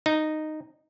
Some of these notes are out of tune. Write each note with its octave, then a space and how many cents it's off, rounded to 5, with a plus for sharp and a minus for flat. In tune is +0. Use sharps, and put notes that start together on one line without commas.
D#4 -10